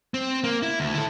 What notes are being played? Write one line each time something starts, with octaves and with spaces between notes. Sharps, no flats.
C4
A#3
E4
D2
E4 A4